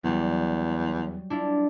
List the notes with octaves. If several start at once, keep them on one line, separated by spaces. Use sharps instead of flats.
E2 F#3 G3
D4 E4 F4